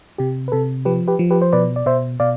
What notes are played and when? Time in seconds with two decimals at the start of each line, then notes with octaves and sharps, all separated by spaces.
0.18 C3 G4
0.48 B4
0.52 C3 A4
0.85 F3 G4 B4
1.08 G4 B4
1.19 F3
1.31 G4 B4
1.42 C5
1.53 B2 B4 D5
1.76 D5
1.86 B2 C5 E5
2.20 B2 D5 F5